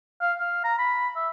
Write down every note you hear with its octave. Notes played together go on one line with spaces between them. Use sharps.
F5
F5
A#5
B5
E5